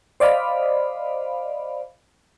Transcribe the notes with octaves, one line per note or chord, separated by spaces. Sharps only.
C5 D5 D#5 F5 B5